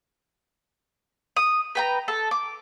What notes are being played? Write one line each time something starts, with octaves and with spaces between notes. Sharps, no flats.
D#6
B4 G5 A#5
A4
D6